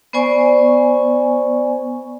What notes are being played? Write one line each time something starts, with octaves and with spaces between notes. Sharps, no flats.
B3 C5 D5 G#5 C#6